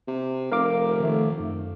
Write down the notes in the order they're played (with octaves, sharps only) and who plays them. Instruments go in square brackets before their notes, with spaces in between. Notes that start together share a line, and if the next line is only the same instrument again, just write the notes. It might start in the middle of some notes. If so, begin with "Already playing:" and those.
[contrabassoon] C3
[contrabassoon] F1 [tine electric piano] A#4 F5 D6
[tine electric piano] D#3 A3
F#2